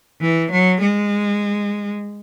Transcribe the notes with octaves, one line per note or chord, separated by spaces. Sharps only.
E3
F#3
G#3